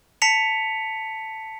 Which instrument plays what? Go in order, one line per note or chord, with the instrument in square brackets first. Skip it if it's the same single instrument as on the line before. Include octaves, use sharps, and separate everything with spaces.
[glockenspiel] A5 B6 C#7 F7